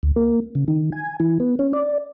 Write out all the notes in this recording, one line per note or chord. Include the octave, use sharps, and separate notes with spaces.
D2
A#3
C#3
D#3
G#5
E3
B3
C#4
D5